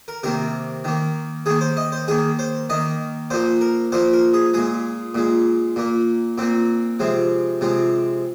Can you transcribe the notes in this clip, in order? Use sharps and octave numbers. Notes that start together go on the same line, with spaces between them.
A#4
C3 D#3 A#3 A#4
D#3 A#3
D#3 A#3 G#4
C5
D#5
C5
D#3 A#3 G#4
C5
D#3 A#3 D#5
A#2 F3 A#3 C5
A#4
A#2 F3 A#3 C5
A#4
G#4
A#2 G#3 G#4
A#2 G#3
A#2 A#3
A#2 A#3 C4
C3 F3 G#3
C3 F3 G#3